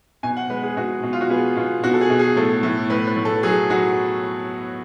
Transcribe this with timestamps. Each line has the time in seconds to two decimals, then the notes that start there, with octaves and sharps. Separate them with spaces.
0.23 B2 G#5
0.37 F#5
0.50 G#3 B4
0.63 G#4
0.77 B2 F#4
1.03 B2
1.13 F4
1.21 F#4
1.30 B3 G#4
1.56 B2 F4
1.84 B2 F#4
1.94 A4
2.01 G#4
2.10 B2
2.19 G#4
2.36 A2 A4
2.63 A2
2.90 A2 B4
3.07 B4
3.17 A2
3.25 A4
3.43 F#3 G#4
3.70 F#3 F#4